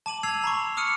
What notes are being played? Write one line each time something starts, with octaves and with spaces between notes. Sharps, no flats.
A5 D6 D#7 F#7
E6 G#6 C7 F7
A#5 B5 C#6
D6 D#6 F6 C#7 D#7